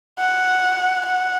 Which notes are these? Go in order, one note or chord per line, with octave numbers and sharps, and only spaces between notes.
F#5
F#5